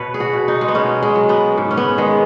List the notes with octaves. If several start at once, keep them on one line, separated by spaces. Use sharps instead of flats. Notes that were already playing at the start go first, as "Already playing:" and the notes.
Already playing: B2 B4 C#5 D#5
G#4
F#4
B2
D#4
G#3
B3
B2 C#4
G#3
F#3
B3
G#2
C#4
B3
D#3 G#3